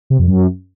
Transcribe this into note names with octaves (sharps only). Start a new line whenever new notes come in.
C3
F2
F#2